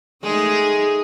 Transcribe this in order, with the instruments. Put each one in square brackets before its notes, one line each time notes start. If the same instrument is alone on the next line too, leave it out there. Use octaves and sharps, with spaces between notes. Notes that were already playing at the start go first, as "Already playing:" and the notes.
[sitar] G#3 [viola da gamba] A3 D#4 G#4